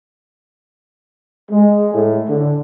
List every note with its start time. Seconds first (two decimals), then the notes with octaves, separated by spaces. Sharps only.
1.50 G#3
1.93 A2
2.28 D3